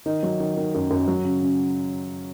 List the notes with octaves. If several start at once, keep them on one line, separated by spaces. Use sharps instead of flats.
D#3 D#4
F#3
D#3
D#3
F#2
F#2
F#3
C#3
C#3